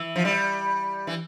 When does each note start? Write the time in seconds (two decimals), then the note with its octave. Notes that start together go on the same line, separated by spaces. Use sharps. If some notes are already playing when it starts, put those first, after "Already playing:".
Already playing: E3
0.16 F3
0.25 G3
1.07 E3